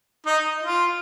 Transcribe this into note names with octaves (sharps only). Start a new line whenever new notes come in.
D#4
F4